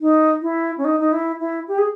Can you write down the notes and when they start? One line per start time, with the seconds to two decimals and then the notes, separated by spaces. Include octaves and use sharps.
0.01 D#4
0.42 E4
0.78 C#4
0.85 D#4
1.00 D#4
1.13 E4
1.40 E4
1.68 G4
1.78 G#4